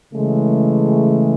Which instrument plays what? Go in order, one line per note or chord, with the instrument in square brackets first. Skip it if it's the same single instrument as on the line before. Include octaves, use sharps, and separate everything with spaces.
[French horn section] C#3 E3 G#3 A3